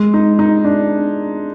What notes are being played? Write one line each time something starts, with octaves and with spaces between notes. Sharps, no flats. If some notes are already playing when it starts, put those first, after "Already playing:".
Already playing: G#3
D#4
D#4
D4